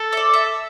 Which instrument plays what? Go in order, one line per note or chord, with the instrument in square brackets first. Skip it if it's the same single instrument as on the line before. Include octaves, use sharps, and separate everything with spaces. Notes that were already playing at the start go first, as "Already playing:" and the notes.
Already playing: [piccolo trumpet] A4
[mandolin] E5
D5
E5